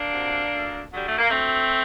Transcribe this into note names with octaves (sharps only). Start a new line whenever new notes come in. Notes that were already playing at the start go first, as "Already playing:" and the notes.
Already playing: A#3 D4
C3 F#3
D2
D3 F#3
G3
A3
A#3
D2 A3 C4